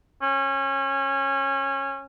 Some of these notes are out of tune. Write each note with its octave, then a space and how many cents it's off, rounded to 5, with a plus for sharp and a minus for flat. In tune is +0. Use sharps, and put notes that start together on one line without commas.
C#4 -25